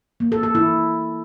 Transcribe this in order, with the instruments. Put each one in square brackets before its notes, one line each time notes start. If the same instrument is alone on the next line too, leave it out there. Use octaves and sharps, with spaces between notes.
[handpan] A#3
A4
A4
E4